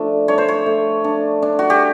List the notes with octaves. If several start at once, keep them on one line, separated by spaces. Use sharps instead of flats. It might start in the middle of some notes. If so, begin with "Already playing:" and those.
Already playing: F3 A3 D4 D5
D4 C#5
C5
C#5
A3
D4
D4
F#4
G4